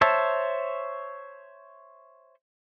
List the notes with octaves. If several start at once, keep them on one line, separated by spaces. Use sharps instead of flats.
C5 C#5 E5 A5